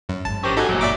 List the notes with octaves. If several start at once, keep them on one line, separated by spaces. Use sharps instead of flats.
F#2
G#1 G#2 A5
C#4 G4 A#4 C5
F#2 D#4 F#4 G4 A4 G#5
F#1 A#2 F#3
D5 E5 D6